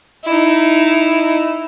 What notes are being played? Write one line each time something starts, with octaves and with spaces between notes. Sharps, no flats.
D#4 E4